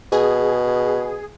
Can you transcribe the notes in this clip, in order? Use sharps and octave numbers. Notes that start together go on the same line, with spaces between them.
B2 G#4